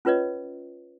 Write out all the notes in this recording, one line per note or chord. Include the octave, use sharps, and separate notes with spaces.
C#4 F4 B4 C#5 D#5